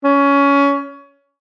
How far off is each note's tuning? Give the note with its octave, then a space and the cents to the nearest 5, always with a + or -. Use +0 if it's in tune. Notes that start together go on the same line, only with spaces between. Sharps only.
C#4 +20